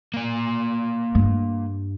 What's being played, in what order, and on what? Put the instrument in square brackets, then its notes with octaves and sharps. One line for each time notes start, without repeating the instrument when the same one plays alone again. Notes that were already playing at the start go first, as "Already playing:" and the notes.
[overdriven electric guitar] A#3 D5
[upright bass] G2